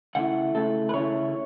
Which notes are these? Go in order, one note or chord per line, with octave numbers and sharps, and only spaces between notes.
C#3 A3 E4 F#5
C#3 A3 E4 A4
B4
C#3 A3 E4 C#5